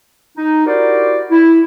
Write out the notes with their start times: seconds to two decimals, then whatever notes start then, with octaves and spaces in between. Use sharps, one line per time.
0.37 D#4
0.66 E4 F#4 G4 A#4 C5 D5
1.31 E4